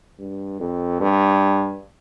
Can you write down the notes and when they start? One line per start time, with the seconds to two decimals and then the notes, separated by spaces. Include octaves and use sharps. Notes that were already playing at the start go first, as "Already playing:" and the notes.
0.19 G2
0.60 F2
1.00 G2